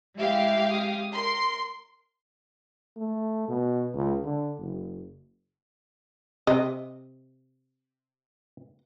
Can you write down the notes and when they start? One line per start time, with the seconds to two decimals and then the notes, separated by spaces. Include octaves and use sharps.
0.19 G#3 E4 G4 E5 F5
0.70 D#6
1.14 A#4 C6
2.97 A3
3.48 B2
3.94 C#2
4.24 D3
4.59 F#1
6.47 C3 D#5